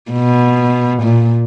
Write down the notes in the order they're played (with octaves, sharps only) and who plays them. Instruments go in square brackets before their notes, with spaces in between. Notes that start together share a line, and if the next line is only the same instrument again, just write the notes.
[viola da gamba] B2
A#2